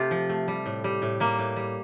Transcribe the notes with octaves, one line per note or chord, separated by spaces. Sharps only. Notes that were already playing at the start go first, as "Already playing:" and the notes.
Already playing: C3 A3 F4 G4
F3
A3
G3
A2
G3
A2
G3 A#3
A2
G3